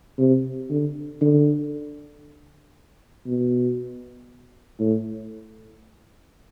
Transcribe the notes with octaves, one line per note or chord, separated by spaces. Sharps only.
C3
D3
D3
B2
A2